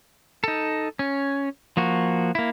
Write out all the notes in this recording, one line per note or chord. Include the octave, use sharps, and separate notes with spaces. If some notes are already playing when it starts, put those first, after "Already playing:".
D#4 A4
C#4
F3 A#3 F#4
A#3 E4